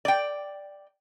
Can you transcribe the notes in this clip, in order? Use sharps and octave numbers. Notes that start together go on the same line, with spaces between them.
D5 G5